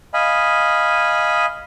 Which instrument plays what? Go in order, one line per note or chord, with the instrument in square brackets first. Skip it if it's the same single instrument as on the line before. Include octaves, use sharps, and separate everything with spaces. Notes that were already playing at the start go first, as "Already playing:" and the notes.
[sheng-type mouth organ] D#5 F5 G#5 B5